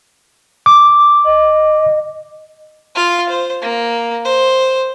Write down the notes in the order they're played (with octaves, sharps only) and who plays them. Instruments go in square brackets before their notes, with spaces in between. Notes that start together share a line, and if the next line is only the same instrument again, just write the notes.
[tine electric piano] D6
[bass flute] D#5
[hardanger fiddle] F4 F5
C5
A#3
C5